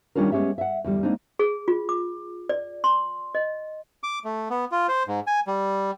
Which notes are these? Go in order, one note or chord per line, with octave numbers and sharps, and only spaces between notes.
D#3 G3 C#4 D4 F4 A#4
G#3 B3 C#4 G4 E5
E5 F#5
E2 D3 G3
G#3 A#3 C4 D4 D#4
G#4
F4
D6
D5
C6
D#5
D6
A3
B3
F4
C5
G#2
G#5
G3